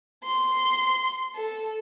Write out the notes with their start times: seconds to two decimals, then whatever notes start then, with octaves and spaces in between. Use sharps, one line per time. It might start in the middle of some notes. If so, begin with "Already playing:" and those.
0.24 C6
1.35 A4